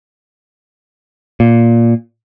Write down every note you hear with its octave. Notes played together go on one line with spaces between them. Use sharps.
A#2